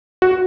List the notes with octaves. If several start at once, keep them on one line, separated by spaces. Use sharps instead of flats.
F#4